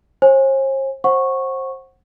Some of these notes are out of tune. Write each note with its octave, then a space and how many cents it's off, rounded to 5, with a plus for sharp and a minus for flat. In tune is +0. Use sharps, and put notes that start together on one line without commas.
C5 +45 G#5 -15
C5 +25 F#5 +0 C#6 -10